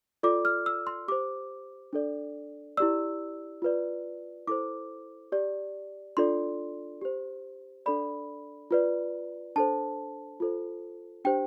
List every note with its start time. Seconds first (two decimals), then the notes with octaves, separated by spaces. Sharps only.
0.23 F4 A4 D5 D6
0.45 F6
0.66 E6
0.87 C6
1.08 G4 C5 D6
1.93 D4 A4 D5
2.77 E4 G4 D5 E6
3.62 F4 B4 D5
4.47 E4 A4 C5 D6
5.32 G4 D5
6.17 D4 F4 A4 D5 C6
7.02 G4 C5
7.86 D4 A4 D5 B5
8.71 F4 B4 D5
9.56 D4 A4 C5 A5
10.40 F4 A4 C5
11.25 D4 G4 C5 G5